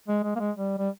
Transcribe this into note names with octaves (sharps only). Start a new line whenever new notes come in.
G#3
G#3
A#3
G#3
G3
G3